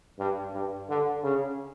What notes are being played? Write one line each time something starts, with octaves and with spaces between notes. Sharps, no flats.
G2
G2
D3
C#3